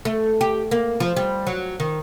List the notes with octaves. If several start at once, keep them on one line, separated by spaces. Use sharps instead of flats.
A3
G4
A#3
F3
G3
F#3
D#3